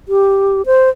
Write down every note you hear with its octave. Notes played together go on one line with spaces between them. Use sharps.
G4
C5